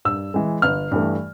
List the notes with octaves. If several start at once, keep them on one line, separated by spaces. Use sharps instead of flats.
G2 E6
E3 G#3
G1 F6
G2 E3 A3